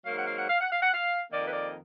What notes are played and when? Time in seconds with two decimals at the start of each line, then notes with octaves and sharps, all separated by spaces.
0.05 G#2 F#3 A#3 F5
0.16 F#5
0.26 F5
0.38 F#5
0.49 F5
0.61 F#5
0.71 F5
0.82 F#5
0.93 F5
1.32 F2 D#3 A#3 D5
1.46 B4
1.53 D5